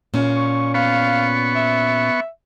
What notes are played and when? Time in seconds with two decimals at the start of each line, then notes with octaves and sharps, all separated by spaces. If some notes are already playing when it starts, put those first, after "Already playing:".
0.14 A#2 C#4
0.36 C#6
0.74 B3 F5 C#6
1.55 E5